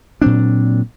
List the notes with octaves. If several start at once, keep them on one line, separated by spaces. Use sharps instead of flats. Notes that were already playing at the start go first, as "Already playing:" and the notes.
A#2 F#3 C4 D4